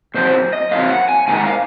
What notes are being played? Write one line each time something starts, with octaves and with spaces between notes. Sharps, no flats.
A#2 F#3 C4 C5
D#5
A#2 F#3 C4 F5
F#5
G#5
G#2 D#3 A#3 G#5
F#5
F5